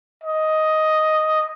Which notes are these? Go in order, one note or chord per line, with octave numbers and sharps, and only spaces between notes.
D#5